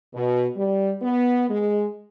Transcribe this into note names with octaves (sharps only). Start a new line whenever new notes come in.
B2
G3
B3
G#3